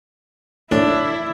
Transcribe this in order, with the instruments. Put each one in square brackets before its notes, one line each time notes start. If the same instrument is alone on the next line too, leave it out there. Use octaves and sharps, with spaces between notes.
[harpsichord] A2 [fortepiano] D4 [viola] E4